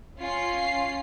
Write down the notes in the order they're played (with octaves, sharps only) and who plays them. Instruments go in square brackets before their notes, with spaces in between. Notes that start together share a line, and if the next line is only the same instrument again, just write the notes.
[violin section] C#4 F4 C7